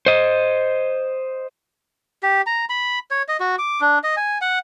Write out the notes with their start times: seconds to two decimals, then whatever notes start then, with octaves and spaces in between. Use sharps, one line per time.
0.06 C5 D#5
2.23 G4
2.47 A#5
2.69 B5
3.11 C#5
3.28 D#5
3.40 F#4
3.59 D6
3.81 D4
4.04 D#5
4.17 G#5
4.41 F#5